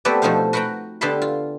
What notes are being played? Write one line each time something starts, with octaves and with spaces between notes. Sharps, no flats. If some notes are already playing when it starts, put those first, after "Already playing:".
A3 B3 C4 G4 B4 D5
B2 F3 A3 D#4 C5 F5
F#4 B4 F#5 G5 A#5
D3 B3 G4 A5 B5 C6
F4